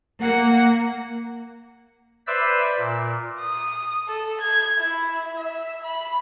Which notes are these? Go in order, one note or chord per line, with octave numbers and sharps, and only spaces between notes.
A#3 F#5
B4 C5 D5 E5 E6
A#2
D#6
A4
G#6
E4
E5
B5